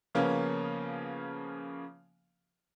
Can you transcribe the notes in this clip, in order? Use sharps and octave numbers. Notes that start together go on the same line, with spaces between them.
C#3 F3 A#3 B3 C#4